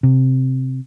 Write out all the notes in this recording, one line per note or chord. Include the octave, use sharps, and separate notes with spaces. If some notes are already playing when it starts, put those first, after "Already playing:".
C3